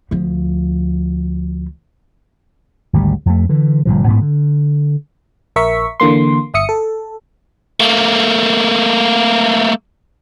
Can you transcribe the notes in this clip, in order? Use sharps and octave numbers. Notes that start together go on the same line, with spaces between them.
D2 F3
G#1 D2 D3 G3
F2 A3
D3 E3
G1 G2 A#2 F3
A1 G#2 B3
D3
A#1 A#4 E5 C#6 B6
D3 E3 A#3 C6
G1 E5 D#6 C#7
A4
A3 A#3